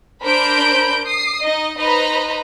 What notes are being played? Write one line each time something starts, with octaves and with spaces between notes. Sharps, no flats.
D4 A#4 C5 B5 G6 D7
D#6 C7
D#4 D#5
D#4 B4 C5 D#5 A#5 B5